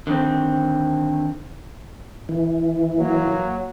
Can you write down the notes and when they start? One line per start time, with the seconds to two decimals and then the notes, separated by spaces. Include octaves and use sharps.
0.07 D3 D#3 C4
2.29 E3
2.98 F#3 A#3